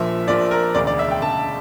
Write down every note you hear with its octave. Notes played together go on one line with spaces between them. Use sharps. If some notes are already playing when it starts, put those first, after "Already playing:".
Already playing: A#1 A#2 F3 E5
A#1 A#2 F3 D5
A#4
E1 D2 C#3 D5
D5
E5
G5
E1 D2 C#3 A5